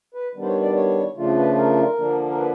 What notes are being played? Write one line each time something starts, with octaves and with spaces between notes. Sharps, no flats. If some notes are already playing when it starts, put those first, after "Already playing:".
B4
D#3 G3 B3 D4
C5
C#5
D5
C#5
C#3 F3 A3 D4 F4
B4
A#4
D3 F3 A#3 D4
A#4
B4